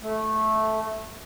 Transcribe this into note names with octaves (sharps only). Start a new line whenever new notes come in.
A3